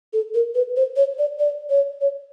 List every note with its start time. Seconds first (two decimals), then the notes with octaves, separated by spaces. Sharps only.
0.13 A4
0.34 A#4
0.55 B4
0.76 C5
0.96 C#5
1.18 D5
1.39 D5
1.70 C#5
2.01 C#5